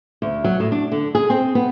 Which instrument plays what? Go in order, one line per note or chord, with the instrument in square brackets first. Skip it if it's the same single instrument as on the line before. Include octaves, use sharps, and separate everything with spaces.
[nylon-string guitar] D2
F#3
A2
D4
D3
G#4
C4
B3